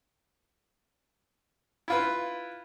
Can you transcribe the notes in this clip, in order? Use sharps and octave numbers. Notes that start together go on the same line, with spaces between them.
E4 F4 B4